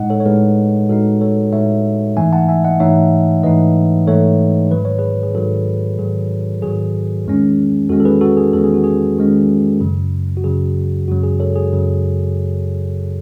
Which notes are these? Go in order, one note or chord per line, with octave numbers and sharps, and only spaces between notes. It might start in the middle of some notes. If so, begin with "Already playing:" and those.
Already playing: A2 G#3 D#4 D#5 F#5
A4 C#5
C#5
A2 G#3 D#4 G#4 B4
A2 G#3 D#4 F#4 A4
A4 C#5
A2 G#3 D#4 C#5 E5
G#2 E3 A3 D#4 E5 G#5
F#5 A5
E5 G#5
D#5 F#5
G#2 E3 A3 D#4 C#5 E5
G#2 E3 A3 D#4 B4 D#5
G#2 E3 A3 D#4 A4 C#5
G#2 D#3 F#3 B4
C#5
G#4 B4
G#4
G#2 D#3 F#3 F#4 A4
G#2 D#3 F#3 G#4
G#2 D#3 F#3 G#4
E2 D#3 G#3 C#4
E2 D#3 G#3 C#4 F#4 A4
A4
G#4 B4
F#4 A4
G#4
E2 D#3 G#3 C#4 A4
G#4
F#4
G#4
E2 D#3 G#3 C#4
F#2 C#3 F#3
F#4
F#2 C#3 F#3 G#4
F#2 C#3 F#3 F#4
G#4
A4 C#5
G#4
F#2 C#3 F#3